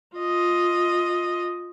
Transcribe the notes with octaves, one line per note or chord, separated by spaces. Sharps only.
F4 D#5